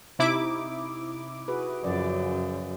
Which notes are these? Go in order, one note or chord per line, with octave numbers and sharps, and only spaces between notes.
C3 D#4 E4 D6
F#4 G#4 B4
F#2 C#3 F3 D5